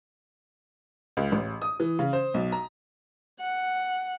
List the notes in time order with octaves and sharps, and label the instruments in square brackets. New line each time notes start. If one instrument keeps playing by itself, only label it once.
[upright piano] C#2
A1
D#6
E3
C#3
C5
B1
A#5
[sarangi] F#5